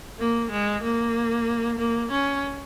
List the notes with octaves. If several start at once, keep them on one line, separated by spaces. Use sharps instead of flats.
A#3
G#3
A#3
A#3
C#4